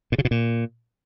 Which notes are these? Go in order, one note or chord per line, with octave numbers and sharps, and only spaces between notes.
A#2
C#3
B2
A#2